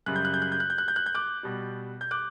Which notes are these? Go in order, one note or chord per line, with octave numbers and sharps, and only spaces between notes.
F#2 C#3 G3 F#6
G6
F#6
G6
F#6
G6
F#6
G6
F#6
G6
F#6
G6
D6 F#6
B2 G3
G6
D6 F#6